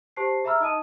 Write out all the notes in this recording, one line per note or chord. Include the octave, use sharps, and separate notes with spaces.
G4 C5 A5 C7
G#4 E5 A#5 B5 E6 F6
D#4 D#5 A5 D#6 D#7